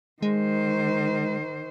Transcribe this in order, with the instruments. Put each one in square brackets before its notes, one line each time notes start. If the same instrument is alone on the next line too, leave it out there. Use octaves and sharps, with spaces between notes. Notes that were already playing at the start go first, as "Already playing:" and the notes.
[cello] D#3 C5 [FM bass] G#3